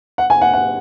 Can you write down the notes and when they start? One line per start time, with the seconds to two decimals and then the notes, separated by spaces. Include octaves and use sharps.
0.18 F#5
0.30 G#5
0.41 F#5
0.53 F#5